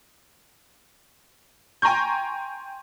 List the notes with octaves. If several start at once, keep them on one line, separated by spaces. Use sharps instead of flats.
G5 G#5 A#5 C6 C#6 G6